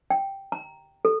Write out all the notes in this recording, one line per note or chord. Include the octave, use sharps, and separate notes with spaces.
G5
A#5
A4